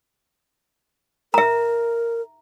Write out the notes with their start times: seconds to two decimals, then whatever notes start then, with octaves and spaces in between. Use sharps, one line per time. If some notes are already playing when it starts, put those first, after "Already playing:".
1.34 A#4 E5 A#5